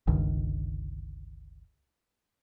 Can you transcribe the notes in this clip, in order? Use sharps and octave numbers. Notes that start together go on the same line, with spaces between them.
G1 C#2 D#3